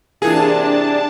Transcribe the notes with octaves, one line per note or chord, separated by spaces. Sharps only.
C3 E3 A#3 D4 G#4 A5